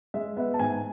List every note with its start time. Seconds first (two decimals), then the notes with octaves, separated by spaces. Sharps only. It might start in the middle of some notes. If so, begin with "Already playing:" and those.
0.14 G#3 E5
0.37 B3 E5
0.54 A5
0.59 G#2 G#5